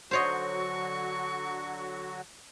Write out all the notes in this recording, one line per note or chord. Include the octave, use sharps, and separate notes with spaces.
D3 F#3 F#4 C5 C#5 D#5 C#6